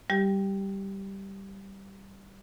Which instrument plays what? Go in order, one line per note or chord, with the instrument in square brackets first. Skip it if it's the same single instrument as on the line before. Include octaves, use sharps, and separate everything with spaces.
[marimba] G3 G4